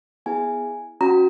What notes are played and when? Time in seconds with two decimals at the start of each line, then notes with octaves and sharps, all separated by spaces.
0.26 B3 E4 G#4 G#5
1.01 C#4 F#4 A#5